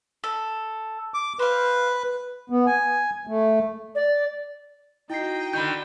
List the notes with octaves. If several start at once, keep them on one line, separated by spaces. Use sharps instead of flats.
A4
D6
B4 C5 F5
B3
G#5
A3
D5
D#4 E4 F#4 G5 C7
D3 D#3 B5 G6